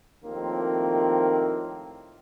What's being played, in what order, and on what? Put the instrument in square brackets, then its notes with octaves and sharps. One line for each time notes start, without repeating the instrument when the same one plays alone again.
[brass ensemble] D#2 A2 D#3 F3 A#3 C4